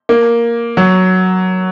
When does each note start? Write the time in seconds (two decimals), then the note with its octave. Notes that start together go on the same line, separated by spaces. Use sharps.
0.09 A#3
0.77 F#3